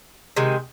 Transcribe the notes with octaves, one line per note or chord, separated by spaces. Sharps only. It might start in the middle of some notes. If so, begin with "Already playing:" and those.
C3 D#3 G#3